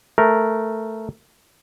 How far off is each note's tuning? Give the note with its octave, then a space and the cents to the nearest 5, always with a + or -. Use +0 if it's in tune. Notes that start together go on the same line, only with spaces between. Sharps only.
A3 +0 A#4 +0